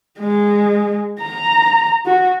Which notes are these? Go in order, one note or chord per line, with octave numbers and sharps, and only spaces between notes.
G#3
A#5
F#4